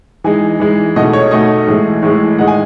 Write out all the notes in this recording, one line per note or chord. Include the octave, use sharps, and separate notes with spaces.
E3 G#3 D#4 G#5
E3 G#3 D#4
B2 A3 D#4 D#5
C#5
B2 A3 D#4 D#5
A2 E3 G#3
A2 E3 G#3
D#3 G#3 D#4 F#5
G#5